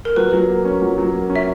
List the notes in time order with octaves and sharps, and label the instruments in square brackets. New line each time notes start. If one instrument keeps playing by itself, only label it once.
[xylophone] A#4
[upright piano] F#3 [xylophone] B4
[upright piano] F#3
A#3
C#4
F#3
F#3
A#3
C#4
[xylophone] E5